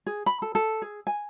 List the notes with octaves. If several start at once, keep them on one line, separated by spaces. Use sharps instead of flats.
G#4
B5
A4
A4
G#4
G#5